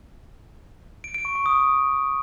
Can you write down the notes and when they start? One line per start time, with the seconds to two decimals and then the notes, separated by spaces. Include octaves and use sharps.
1.04 D7
1.14 D7
1.25 C#6
1.35 C#6
1.46 D#6